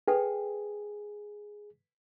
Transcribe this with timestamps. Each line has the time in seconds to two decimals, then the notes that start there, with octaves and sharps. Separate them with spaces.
0.08 G#4 A4 B4 G5